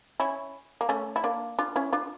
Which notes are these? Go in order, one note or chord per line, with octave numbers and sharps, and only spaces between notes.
C#4 E4
A#3
A3 C#4
E4
A#3 D4
D4 F4
C#4 E4
D4 F4